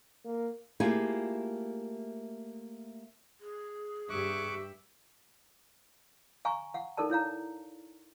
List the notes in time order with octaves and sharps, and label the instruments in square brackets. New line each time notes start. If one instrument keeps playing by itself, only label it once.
[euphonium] A#3
[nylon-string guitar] A3 A#3 E4 F4 G4 G#4
[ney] G#4
[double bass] G2 [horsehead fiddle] G4 E5 [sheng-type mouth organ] C#6 D6 F#6
[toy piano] F5 G#5 A#5 C#6
F5 F#5
D#4 A4 A#4 D5 A5
E4 C#5 F5 A#5